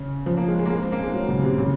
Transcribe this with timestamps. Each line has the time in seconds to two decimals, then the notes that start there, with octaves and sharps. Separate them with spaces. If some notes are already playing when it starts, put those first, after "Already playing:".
Already playing: C#3
0.26 F3
0.37 A#3
0.48 G#3
0.59 G#3
0.65 A#3
0.70 G#3
0.81 C4
0.92 A#3
1.03 G#3
1.14 F#3
1.29 C#3
1.43 C3
1.58 C#3